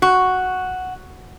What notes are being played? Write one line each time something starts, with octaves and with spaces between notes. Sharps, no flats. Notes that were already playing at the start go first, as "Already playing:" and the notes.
F#4